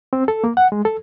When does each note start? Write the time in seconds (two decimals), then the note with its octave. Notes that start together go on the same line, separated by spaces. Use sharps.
0.13 C4
0.28 A4
0.44 A#3
0.57 F#5
0.72 G#3
0.85 A4